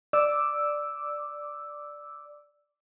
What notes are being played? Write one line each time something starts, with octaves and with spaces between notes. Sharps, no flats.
D5 D6 E6